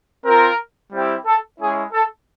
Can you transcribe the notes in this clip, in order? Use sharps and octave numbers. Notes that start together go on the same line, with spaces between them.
C4 F4 A#4
G3 C4 E4 G4
A4
G#3 C#4 E4 G#4
A4